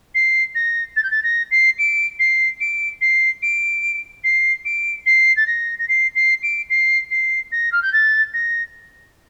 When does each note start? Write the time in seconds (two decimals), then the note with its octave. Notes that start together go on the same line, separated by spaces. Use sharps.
0.14 C7
0.55 A#6
0.96 A6
1.03 G6
1.10 A6
1.23 A#6
1.51 C7
1.78 D7
2.19 C7
2.60 D7
3.01 C7
3.42 D7
4.23 C7
4.65 D7
5.06 C7
5.36 A6
5.46 A#6
5.78 A#6
5.88 C7
6.15 C7
6.42 D7
6.69 C7
7.10 C7
7.51 A#6
7.72 F6
7.82 G6
7.92 A6
8.33 A#6